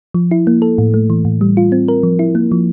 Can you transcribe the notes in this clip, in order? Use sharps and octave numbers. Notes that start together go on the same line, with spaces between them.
F3
E4
A#3
A4
A2
A3
E3
A2
G3
F4
C4
A#4
F3
E4
A#3
F3